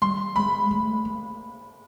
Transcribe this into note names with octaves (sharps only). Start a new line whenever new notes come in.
G3 C6
G#3 B5
A3
A#3